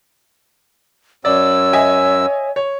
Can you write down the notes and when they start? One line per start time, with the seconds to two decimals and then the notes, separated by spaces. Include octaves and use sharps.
1.25 F#2 C#5 D5 E6
1.73 D#5 E5 G#5
2.56 C#5